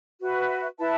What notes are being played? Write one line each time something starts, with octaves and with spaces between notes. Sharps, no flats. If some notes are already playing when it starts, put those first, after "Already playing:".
F#4 B4 E5
E4 B4 E5 A5